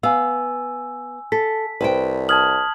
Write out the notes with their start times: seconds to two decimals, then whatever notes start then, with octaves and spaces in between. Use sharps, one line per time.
0.03 B3 F5 G#5 E6
1.32 A4 B6
1.81 C2 B4 C5 G5
2.29 A5 D#6 F6 G#6 F#7